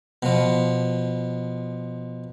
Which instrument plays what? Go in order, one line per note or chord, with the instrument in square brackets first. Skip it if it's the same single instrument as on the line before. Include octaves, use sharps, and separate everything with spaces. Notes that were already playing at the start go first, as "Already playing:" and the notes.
[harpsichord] B2 F3